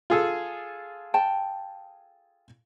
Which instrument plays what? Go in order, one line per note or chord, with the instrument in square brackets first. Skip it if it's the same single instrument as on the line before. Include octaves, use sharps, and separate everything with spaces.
[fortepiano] F4 G#4 A4
[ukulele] G5 A5